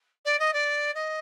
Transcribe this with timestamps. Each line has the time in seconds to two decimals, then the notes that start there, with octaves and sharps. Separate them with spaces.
0.25 D5
0.39 D#5
0.53 D5
0.94 D#5